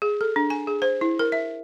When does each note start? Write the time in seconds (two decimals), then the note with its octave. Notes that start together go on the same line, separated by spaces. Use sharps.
0.02 G#4
0.21 A4
0.36 D4
0.50 G#5
0.67 G#4
0.82 C5
1.01 E4
1.19 A#4
1.32 E5